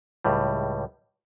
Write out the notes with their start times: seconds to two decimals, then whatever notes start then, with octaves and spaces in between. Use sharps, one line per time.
0.24 C#2 A2 G3